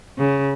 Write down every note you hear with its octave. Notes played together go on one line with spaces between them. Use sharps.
C#3